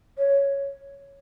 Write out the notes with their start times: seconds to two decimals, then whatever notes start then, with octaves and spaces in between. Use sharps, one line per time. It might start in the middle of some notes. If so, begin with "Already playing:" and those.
0.18 C#5